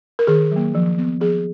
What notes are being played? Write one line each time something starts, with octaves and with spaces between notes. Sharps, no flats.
A#4
D#3 G#4
F#3 A#3
F3
B3
F3 G#4